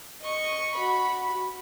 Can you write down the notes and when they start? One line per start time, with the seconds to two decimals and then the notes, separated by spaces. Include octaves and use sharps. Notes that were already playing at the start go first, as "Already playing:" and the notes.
0.21 D#5 C#6
0.74 F#4 B5